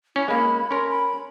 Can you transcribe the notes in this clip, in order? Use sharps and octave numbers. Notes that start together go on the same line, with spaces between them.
C#4 E4
G#3 A#3 B5
C#4 A#4 C6
B5